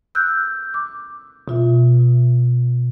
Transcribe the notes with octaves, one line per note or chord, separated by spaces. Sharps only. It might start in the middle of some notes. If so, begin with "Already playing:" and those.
E6 F#6 G6
D6
B2 F4 E5